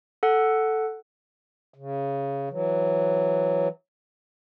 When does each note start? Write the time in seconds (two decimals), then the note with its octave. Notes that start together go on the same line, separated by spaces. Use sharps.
0.23 A4 F#5
1.74 C#3
2.50 E3 F#3